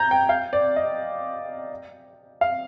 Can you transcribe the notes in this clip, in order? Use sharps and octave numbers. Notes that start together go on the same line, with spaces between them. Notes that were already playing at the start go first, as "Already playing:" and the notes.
Already playing: A#5 G6 G#6
G5
F5
D5
D#5
F5